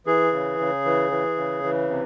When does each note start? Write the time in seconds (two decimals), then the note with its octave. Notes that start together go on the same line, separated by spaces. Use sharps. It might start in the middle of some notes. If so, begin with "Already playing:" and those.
0.06 E3 G#4
0.33 C#3
0.59 C#3
0.85 E3
1.11 E3
1.37 C#3
1.63 E3
1.89 C3